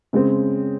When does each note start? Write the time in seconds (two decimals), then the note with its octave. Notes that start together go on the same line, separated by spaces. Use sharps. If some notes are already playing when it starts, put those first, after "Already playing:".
0.13 C#3 G#3 C4